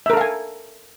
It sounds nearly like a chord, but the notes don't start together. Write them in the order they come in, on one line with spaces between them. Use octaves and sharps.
E5 A#4 A4 F5 G#5